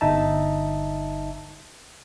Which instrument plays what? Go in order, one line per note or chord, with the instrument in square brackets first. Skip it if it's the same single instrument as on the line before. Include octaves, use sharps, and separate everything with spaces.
[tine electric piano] G1 D#4 E5 A5